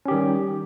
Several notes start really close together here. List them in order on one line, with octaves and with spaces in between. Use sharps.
C#4 G4 D#3 G3